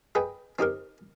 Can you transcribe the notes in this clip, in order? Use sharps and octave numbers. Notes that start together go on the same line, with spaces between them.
G#4 B4 D#5 G5
C4 D#4 G4 A#4